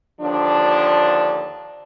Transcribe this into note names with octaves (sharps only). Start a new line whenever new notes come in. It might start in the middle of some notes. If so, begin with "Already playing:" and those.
D#2 D3 F3 D4